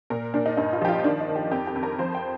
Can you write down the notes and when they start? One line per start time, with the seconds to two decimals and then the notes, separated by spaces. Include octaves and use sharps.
0.10 A#2 A#4
0.34 A#2 D4
0.46 D#4
0.57 G2 D#4
0.73 F4
0.81 F3 G4
0.89 F4
1.04 D#3 D4
1.20 D#4
1.28 D#3
1.36 G4
1.51 F2 G4
1.67 G4
1.76 F2
1.83 A#4
1.99 F3 C5
2.15 G5